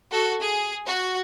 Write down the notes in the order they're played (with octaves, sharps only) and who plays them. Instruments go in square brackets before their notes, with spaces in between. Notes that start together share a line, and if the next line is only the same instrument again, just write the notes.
[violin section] F#4 A4
G#4
F#4